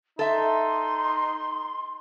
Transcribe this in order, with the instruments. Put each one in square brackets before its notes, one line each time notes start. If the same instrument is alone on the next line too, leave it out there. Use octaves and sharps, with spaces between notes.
[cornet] D#4 [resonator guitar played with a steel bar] A4 E5 [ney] C6